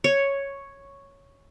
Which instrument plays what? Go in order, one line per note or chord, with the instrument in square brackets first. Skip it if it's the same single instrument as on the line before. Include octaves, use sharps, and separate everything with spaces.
[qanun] C#5